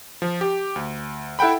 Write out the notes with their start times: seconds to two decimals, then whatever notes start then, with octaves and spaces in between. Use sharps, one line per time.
0.22 F3
0.41 G4
0.76 D2
1.39 E4 A4 F#5 G5 B5